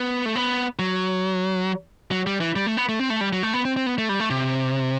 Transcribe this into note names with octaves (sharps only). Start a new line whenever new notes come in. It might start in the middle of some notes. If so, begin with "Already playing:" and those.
Already playing: B3
A3
B3
F#3
F#3
G3
E3
G3
A3
B3
A3
C4
A3
G3
F#3
A3
B3
C4
C4
B3
A3
G3
A3
C3